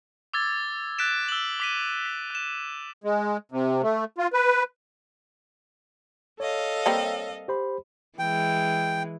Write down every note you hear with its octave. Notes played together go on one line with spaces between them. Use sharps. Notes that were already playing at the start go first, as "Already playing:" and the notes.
D6 E6 G#6 A6
F#6 A6 B6 D7 E7
E6 F#7
D6 B6 D#7
B6
F#6 E7
G#3
C3
A3
F4
B4
A4 C#5 D#5 F5
G3 A#3 C4
G4 C5 B5
E3 G#3 G5